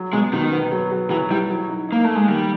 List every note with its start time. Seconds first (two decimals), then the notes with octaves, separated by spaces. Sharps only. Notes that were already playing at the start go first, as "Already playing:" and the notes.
Already playing: F#3
0.13 B2 G#3
0.33 B2 D#3
0.52 B3
0.72 F#3
0.92 F#3
1.10 E3 F#3
1.30 G3 E4
1.50 F#3
1.69 D#4
1.89 A#3 D#4
2.04 A3 A#3
2.15 G#3
2.28 D#3 G3